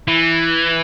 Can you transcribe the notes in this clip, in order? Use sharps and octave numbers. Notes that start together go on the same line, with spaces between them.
E3